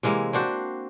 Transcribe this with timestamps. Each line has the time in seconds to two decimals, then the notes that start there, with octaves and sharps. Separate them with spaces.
0.03 C3 E3 G#3 A#3
0.33 C4 D4 F#4 C5